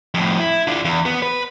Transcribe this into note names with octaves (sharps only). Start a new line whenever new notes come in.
F2 A2
E4
D4 F4
E2
B3
B4